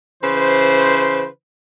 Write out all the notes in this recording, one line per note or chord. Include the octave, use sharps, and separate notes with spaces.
C#3 E3 B4 C5